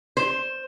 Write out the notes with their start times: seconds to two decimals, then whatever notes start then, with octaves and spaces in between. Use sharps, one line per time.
0.17 C5